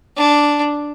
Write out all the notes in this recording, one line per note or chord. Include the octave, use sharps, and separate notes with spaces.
D4